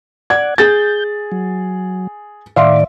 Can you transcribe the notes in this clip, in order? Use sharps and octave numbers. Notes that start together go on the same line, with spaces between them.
D5 F#5 G#6
G#4 G6 A6
F#3
A2 D#3 D5 E5 F5 C6